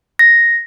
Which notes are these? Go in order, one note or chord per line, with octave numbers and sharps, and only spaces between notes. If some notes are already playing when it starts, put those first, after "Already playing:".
A#6